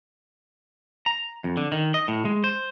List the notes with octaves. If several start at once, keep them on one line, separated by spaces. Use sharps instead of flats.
A#5
F2
D3
D#3
D#5
A2
G#3
C5